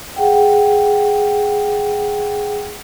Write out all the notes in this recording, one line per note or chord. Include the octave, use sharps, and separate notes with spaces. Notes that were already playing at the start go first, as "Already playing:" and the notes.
G#4 F#5 G5